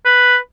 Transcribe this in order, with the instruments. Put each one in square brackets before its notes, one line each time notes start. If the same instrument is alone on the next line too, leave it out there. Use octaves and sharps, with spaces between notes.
[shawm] B4